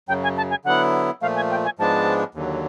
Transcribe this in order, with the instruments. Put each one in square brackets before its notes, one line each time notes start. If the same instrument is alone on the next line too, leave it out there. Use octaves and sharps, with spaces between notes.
[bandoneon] F#2 C#3 F#3 [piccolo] G5
[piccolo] G#5
A5
G#5
[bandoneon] D3 F#3 B3 E4 [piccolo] F#5
[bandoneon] A#2 F3 A3 [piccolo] F5
[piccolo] G#5
G5
G#5
[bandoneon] G#2 F3 G#3 B3 D4 [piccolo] A5
[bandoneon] D#2 D3 F#3